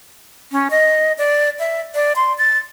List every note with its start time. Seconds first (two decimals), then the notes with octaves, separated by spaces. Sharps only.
0.52 C#4
0.70 D#5
1.18 D5
1.59 E5
1.95 D5
2.16 C6
2.38 A6